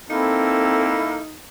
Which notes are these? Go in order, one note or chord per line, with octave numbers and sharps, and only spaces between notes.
A#3 C4 D#4 E4 A4